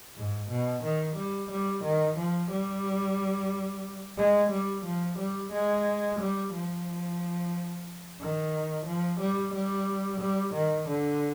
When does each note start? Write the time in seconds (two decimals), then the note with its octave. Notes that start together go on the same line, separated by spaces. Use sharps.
0.17 G#2
0.50 B2
0.84 D#3
1.16 G3
1.51 G3
1.84 D#3
2.17 F3
2.51 G3
4.18 G#3
4.51 G3
4.85 F3
5.19 G3
5.52 G#3
6.19 G3
6.53 F3
8.20 D#3
8.86 F3
9.21 G3
9.54 G3
10.21 G3
10.54 D#3
10.88 D3